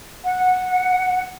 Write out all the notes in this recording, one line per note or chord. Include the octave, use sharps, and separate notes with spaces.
F#5